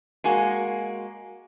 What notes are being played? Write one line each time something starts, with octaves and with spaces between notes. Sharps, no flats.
G#3 A#3 F#4 G#5